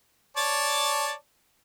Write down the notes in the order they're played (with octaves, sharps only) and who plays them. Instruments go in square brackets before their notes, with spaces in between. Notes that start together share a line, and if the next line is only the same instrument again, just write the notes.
[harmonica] C#5 D5 A5